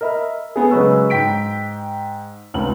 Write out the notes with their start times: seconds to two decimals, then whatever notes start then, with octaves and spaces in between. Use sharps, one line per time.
0.01 A#4 D#5 E5 B5
0.56 A3 B3 G#4
0.71 C#3 F#3 G#3 B4 C#6 E6
1.10 G#2 G5 B6 D7
2.54 F1 C#2 F#7